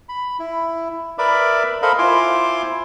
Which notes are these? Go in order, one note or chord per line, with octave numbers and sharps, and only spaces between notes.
B5
E4
A#4 B4 D5 E5 B5 D6
A4 A#4 C5 D#5 F5 B5
E4 F4 C5 G#5 C6 D6